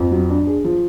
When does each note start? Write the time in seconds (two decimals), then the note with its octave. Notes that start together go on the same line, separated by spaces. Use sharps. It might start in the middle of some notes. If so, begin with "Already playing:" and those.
Already playing: F2
0.11 F#3
0.29 D4
0.47 G#4
0.65 F3